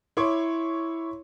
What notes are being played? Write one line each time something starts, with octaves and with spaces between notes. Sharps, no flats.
E4 C#5 C6 D6